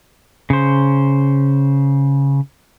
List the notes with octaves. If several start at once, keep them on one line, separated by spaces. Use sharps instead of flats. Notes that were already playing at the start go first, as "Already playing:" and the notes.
C#3 C5